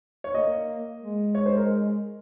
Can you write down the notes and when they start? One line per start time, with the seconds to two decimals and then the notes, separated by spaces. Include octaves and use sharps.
0.24 C#5
0.34 A#3 D#5
1.01 G#3
1.35 C#5
1.46 C5
1.57 A#4